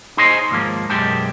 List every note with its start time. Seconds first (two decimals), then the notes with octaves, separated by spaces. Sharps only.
0.17 D#4 G#4 C5 C#5 D#5
0.51 D#2 G#2 F3 A#3
0.90 B1 F#2 G#3 G4 A5